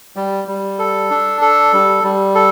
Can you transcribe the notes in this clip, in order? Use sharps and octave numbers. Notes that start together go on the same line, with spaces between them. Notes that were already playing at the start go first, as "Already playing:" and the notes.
G3
G3
A4
D4
A4
G3
G3
A4